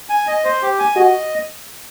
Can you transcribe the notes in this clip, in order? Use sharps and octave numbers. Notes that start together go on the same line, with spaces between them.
G#5
D#5
C5
G4
G#5
F#4 D#5